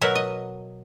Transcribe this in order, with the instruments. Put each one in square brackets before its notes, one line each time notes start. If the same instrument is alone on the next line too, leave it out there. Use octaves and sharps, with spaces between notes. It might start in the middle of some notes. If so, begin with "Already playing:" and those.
[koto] B2 F#3 A#4 E5 F#5
D#5